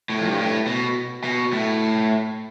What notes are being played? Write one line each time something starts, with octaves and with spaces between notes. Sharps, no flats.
A2
F2
G2
A2
B2
B2
A2